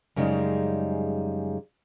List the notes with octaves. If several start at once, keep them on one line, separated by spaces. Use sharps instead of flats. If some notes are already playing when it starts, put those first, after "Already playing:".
F#2 C#3 G3 G#3 D#4